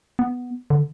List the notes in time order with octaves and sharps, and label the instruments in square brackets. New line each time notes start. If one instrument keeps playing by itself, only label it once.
[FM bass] B3
D3